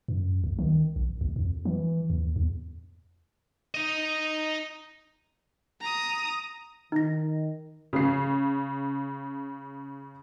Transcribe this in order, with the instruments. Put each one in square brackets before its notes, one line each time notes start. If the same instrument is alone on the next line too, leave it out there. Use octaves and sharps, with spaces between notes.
[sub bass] F#2
C#2
D#3
A#1
D2
F2
E3
D#2
E2
[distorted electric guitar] D#4 D#5
[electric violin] A#5 D#6
[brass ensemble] D#3 [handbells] D#4 A#6
[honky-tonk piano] C#3 C7